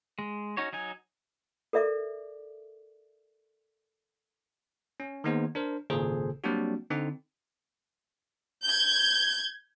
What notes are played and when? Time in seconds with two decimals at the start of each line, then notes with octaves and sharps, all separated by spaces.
0.19 G#3
0.57 C#4 D#4 F#4 C#5
0.73 F#3 D#4 G#5
1.73 A4 A#4 D5 E5 D6
5.00 C#4
5.24 D#3 A#3 B3 D#4 G#4 C5
5.55 D4 A#4 C5
5.90 G#1 A#2 C#3 G#4 A4 C5
6.44 F#3 G3 A#3 C4 D4 F#4
6.90 D3 C4 D#4
8.63 G6 G#6